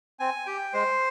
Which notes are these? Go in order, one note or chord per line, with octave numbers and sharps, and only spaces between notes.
C4 G#5
G4 G5
G#3 C5